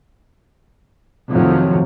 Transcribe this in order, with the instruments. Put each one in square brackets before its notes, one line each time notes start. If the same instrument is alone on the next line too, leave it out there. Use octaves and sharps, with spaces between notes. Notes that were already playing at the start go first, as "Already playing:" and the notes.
[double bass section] F2 A2 C3 D#3 F3 F#3